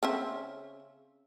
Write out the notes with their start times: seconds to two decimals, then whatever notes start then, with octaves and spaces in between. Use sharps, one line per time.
0.03 C#3 C4 E5